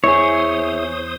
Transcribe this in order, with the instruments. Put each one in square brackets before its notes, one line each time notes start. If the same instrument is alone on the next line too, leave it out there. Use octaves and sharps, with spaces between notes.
[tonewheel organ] E2 C5 D#6 [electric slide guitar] E4 G#4 [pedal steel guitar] C#5